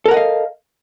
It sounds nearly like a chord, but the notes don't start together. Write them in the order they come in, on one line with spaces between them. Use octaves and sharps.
A4 A#4 F#5 D#5 F5